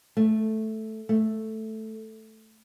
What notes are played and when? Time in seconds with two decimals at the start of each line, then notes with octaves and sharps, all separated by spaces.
0.17 A3
1.09 A3